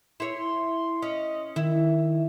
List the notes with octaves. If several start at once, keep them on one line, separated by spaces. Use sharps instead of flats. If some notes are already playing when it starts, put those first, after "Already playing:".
E4 C#5 C6
C#4 D#5
D#3 E4